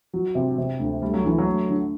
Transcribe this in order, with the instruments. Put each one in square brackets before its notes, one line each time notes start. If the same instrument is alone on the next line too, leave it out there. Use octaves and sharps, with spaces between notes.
[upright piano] F#3
C3
C3
D2
[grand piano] G3 [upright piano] A3
[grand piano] F#3
[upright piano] D3 [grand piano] E3
[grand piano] F#3
[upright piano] A3
D3